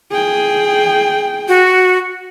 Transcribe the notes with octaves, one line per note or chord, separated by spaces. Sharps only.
G#4 G5
F#4